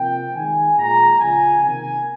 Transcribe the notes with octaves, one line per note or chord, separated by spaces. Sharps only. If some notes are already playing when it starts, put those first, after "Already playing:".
Already playing: C3 F3 A#3 G5
D#3 G#3 G#5
A#2 G#3 A#5
C#3 F3 G#3 G#5
C3 D#3 A#3 G#5